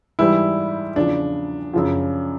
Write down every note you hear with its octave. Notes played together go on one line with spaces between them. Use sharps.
G#2 E3 G3 E4
E2 C#3 F3 D4
F#2 C#3 F3